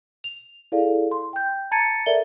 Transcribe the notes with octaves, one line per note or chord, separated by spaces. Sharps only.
F7
E4 G#4 A4 D5 F5
C6
G5 G6
A5 A#5 G#6 A6 C#7 D#7
A4 A#4 D5 E5 G7